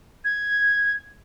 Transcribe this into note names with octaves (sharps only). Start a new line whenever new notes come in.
G#6